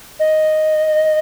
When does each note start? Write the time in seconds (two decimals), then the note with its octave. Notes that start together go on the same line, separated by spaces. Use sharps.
0.20 D#5